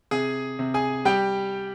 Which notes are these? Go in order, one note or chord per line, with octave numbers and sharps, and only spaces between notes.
C3 G#4 G#5
C3
G#4 G#5
G3 G4 G5